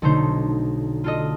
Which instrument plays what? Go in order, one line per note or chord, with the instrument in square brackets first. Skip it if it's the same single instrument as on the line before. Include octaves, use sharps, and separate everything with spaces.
[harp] B1 D3 A3 D#4 C5
F4 A4 D#5